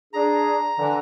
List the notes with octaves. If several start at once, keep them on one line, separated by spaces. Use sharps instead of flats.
D4 G#4 A#5
D3 E3